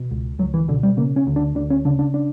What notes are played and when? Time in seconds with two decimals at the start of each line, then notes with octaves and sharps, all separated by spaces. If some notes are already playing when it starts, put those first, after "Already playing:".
Already playing: B2
0.11 C#2
0.39 C#2 F#3
0.54 E3
0.68 B2 D3
0.83 G3
0.97 C#3 A#3
1.16 C#4
1.27 D2
1.36 D4
1.55 D2 D4
1.70 C#4
1.85 C#3 D4
1.99 D4
2.14 D4